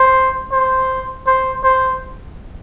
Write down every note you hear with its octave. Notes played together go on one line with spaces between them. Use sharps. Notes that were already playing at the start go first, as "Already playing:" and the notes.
Already playing: C5
C5
C5
C5